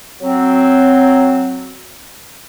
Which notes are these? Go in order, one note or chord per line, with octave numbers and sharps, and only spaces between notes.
F#3 C4